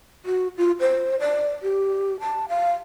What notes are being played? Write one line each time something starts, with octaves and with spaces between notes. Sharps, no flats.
F#4
F4
C5
D5
G4
A5
F5